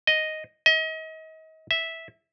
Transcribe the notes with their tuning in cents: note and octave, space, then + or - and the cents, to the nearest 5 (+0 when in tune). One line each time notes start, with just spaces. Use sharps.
D#5 +0
D#5 +35
E5 -10